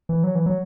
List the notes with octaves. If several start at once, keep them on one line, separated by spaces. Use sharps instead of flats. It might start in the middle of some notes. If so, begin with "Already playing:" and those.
E3
F#3
E3
F#3